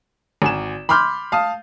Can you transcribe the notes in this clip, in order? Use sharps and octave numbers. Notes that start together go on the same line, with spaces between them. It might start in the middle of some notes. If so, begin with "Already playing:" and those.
G#1 G#5 E7
B5 C6 D6 F6 G6
F5 A5 D#6